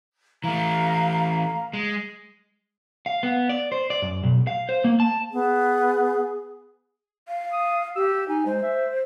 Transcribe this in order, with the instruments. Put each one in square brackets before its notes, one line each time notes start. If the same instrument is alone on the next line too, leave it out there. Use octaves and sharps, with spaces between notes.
[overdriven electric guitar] E3 A3 [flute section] F5 A#5
[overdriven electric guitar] G#3
[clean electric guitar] F5
B3
D5
C5
D5
F#2
B1
F5
C5
A#3
A5
[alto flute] B3 [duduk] G#4
[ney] F5
[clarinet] D#6
[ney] G4 [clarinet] E6
[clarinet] D#4 [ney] G#5
[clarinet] G#3 [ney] C5
[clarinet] E5